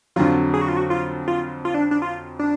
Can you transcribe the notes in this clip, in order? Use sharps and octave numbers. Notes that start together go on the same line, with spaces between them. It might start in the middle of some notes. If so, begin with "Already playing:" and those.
F2 D3 F#3 F4
G#4
F#4
F4
F#4
F4
F4
F4
D4
D4
F4
D4